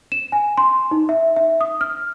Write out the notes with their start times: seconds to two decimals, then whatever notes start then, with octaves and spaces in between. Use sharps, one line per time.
0.12 E7
0.32 G#5
0.58 C6
0.91 D#4
1.09 E5
1.36 E5
1.61 D#6
1.81 F6